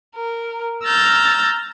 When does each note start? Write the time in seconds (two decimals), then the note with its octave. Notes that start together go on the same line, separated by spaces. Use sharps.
0.17 A#4
0.86 A#5 E6 F6 G6 A6